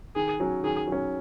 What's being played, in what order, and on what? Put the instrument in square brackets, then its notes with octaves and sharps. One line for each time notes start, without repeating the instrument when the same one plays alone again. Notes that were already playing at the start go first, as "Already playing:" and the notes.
[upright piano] D#3 [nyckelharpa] G#4
[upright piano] F#3 C#4
[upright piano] D#3 [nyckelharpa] G#4
[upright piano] F#3 C#4